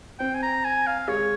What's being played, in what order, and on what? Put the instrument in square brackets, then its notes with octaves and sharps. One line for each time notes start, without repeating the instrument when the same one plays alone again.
[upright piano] C4 [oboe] G5
[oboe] G#5
A#5
G#5
F5
[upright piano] G#3 [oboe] C#5